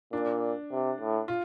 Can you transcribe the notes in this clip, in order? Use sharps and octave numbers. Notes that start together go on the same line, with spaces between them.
A#2 D4
C3
A2
F4